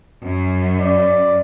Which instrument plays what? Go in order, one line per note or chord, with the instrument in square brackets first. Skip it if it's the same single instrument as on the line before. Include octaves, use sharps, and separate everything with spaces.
[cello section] F#2
[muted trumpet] D5